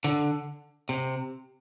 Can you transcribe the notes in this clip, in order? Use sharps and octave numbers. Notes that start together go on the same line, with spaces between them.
D3
C3